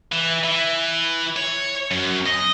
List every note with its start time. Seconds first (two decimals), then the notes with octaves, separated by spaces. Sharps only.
0.12 E3
0.44 E3
1.36 C#5
1.91 F#2
2.26 D#5